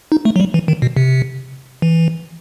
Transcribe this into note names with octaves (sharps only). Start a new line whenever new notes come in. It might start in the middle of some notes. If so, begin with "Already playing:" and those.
D#4
A3
F#3
G3
E3
D#3
B2
C3
E3